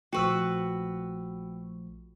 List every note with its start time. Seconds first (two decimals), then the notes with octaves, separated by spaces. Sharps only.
0.13 A#1 F3 A3 F#4 B4 G5 C#6 E6